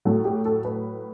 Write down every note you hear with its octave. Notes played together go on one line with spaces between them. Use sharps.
A2 F#3 A4
G4
A4
B4